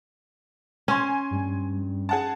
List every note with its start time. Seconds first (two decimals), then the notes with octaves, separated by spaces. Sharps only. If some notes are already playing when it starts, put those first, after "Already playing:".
0.88 C#4 G#5 C6
1.31 G2
2.09 G#4 F#5 A5